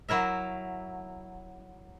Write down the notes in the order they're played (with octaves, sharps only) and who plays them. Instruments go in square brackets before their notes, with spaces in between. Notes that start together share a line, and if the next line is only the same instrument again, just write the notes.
[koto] F#3 E4 A#4 E5